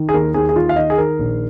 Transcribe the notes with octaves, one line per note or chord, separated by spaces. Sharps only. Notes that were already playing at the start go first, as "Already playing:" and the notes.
Already playing: D#3
G#4
D#2 A#4
D#2 G#4
G#4
D#3 F4
F5
D#3 D#5
G#4
D#3 A#4
A#1